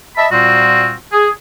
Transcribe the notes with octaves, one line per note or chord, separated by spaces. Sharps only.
D#5 E5 A5 B5
A#2 G3 C4 F4 F#4
G#4